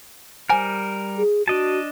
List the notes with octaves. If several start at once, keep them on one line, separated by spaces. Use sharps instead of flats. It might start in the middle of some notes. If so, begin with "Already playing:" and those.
G3 A#4 C5 G#5
G#4
D4 F#4 D#5 A5